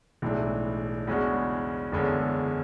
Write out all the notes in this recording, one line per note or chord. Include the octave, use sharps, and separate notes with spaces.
B1 A2 E3 G#3 D4
E2 C#3 G#3 D4 F#4
F#1 E2 D3 G#3 C#4